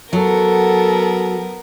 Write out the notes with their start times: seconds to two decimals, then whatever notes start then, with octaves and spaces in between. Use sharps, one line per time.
0.13 F#3 B3 A4 A#4